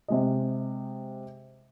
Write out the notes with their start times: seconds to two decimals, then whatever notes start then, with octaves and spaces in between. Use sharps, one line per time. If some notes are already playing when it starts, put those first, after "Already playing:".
0.08 C3 G#3 D#5